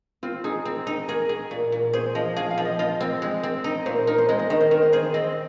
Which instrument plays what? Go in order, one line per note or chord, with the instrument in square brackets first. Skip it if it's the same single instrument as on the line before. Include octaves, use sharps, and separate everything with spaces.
[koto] C4 [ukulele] F4
[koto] D#4 [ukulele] G#4
[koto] C4
D#4
[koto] G#4 [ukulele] A#4
[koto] G#4
A#2
A#2
[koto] G#4 [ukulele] C5
[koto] F3 [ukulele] D#5
[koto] G#4 [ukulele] F5
[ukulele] F5
[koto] F3
[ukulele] D#5
[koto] F4 [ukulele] D#5
[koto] C4
G#3
C4
[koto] D#4 [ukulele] D#5
[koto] A#2 [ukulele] C5
[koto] D#4 [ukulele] A#4
[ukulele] C5
[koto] G#3 [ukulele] D#5
[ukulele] D#5
[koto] D#3 [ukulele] D#5
[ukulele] C5
[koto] D#3 [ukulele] A#4
[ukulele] C5
[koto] G#4 [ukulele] C5
[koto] C4 [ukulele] D#5